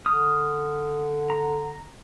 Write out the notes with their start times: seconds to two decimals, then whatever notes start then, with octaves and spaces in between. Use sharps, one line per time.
0.06 D3 D#6 F6
1.30 A#5